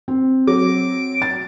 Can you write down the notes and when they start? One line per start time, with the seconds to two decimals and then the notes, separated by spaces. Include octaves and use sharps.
0.08 C4
0.47 F#3 D6
1.22 A6